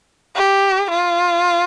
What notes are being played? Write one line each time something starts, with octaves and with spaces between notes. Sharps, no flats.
G4
F4